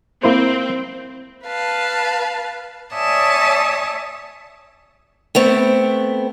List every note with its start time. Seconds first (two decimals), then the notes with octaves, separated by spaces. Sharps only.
0.23 A#3 C4 E4 C5
1.45 B4 F5 A5
2.94 C#5 D5 E5 G#5 A5 D#6
5.35 A3 B3 C4